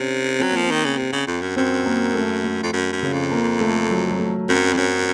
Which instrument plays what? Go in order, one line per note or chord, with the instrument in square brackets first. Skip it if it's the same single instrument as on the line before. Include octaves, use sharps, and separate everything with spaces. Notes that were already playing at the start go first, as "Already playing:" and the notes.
Already playing: [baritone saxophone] C3 [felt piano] C#4
[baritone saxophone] F#3 [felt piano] C4
[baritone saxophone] F3 [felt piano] A#3
[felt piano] C4
[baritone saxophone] D#3
C#3
C3
C#3
F2
F#2
[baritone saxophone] F#2 [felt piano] C4
[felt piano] A#3
A3
A3
[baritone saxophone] F2
F#2
F#2
[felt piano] C#3
[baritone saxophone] F2
[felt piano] A#3
A3
F#3
F#3
A3
[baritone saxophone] F#2 [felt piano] C4
[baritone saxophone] F2 [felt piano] C4
[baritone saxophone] F#2 [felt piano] C#4